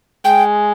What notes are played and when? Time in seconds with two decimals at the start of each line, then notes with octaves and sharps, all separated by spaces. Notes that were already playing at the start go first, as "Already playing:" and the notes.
0.25 G#3 G5